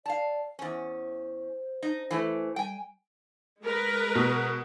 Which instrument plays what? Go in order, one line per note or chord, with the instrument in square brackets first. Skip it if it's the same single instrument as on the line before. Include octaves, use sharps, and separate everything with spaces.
[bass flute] D5 [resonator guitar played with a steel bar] F5 A5
[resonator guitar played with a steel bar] E2 C#4 [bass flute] C5
[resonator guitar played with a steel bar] D#4
E3 A3
[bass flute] G3 [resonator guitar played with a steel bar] G5 G#5
[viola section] G#3 A#4 B4
[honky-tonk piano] B2